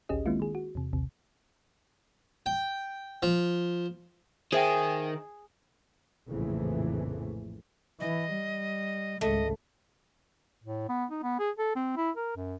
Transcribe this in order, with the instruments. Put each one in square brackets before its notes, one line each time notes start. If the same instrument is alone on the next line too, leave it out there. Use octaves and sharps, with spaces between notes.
[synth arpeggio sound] A1 D2 C#4 G4 G#4 D#5
D#3 G#3 A#3 C4 E4 F4
D#3 G#4
F#4
E2 C3
A#1 D#2 C3
[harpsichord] G5
F3
[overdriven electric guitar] D#3 [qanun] G#4 [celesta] C5 E5 G5
[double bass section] A#1 F2 A2 C#3 E3 A3
[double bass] E3 [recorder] D#5
[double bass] G3
[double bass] G#1 C#2 [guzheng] A3 [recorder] D#5
[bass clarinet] A2
B3
D#4
B3
G#4
A4
C4
E4
A#4
F#2